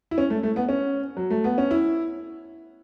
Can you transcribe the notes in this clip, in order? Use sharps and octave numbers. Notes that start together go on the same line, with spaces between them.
E4
C#4
A3
A3
B3
C#4
F#3
A3
B3
C#4
E4